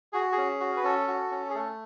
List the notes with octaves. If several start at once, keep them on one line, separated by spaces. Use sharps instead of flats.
F#4 G#4
G#4
C#4
F#4
B4
C#4 A4
F#4
C#4
G#4
A3 A4